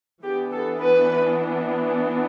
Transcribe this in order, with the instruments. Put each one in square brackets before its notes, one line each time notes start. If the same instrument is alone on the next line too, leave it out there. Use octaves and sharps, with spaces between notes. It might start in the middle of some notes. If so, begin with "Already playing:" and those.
[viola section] E3 B3 D4 G4
A4
B4